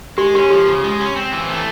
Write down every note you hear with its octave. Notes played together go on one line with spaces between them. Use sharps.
G#3 G4
C#4 G4
F3 G4
C#3
G#3
C#4
C4
E3
A3